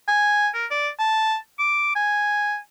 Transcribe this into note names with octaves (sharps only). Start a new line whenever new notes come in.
G#5
A#4
D5
A5
D6
G#5